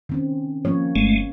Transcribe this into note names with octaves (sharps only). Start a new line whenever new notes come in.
D#3 C4 C#4
F3 A#3 C#4 C#5
G1 G#3 A3